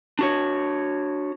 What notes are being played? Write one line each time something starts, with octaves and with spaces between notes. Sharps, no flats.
D4 F#4 C#5